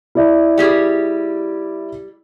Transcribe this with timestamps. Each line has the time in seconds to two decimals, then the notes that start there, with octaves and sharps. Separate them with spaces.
0.15 E4 D5
0.58 G3 G4 G#4